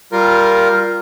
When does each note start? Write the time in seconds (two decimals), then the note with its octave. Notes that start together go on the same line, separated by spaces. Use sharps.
0.12 G3 F4 A#4